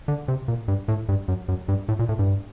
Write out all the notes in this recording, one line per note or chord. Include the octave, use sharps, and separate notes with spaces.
D3
C3
A#2
G2
A2
G2
F#2
F#2
G2
A2
A#2
A2
G2